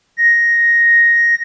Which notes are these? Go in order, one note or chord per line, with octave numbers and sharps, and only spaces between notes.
A#6